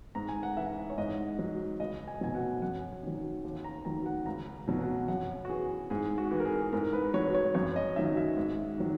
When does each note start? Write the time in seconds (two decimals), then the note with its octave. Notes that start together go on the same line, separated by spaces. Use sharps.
0.15 G#2 A#5
0.29 G#5
0.43 F#5
0.57 E3 E5
0.90 C#5
0.98 G#2 D#5
1.39 F#3
1.80 C#2 D#5
2.08 G#5
2.21 B2 F#3 G#5
2.35 F#5
2.62 F#2 F#5
3.03 D#3 F#3
3.44 D#2
3.64 A#5
3.85 D#3 F#3 A#5
4.06 F#5
4.26 C#2 A#5
4.67 B2 F#3
4.81 F#5
5.08 F#2 F#5
5.45 F#4
5.49 E3 G#4
5.90 G#2 G#4
6.18 F#4
6.31 E3
6.40 A#4
6.45 G#4
6.73 G#2 A#4
6.93 B4
7.14 F#3 C#5
7.35 C#5
7.54 F#2 C#5
7.76 D#5
7.96 D#3 F#3 E5
8.17 E5
8.36 G#2
8.78 D#3 F#3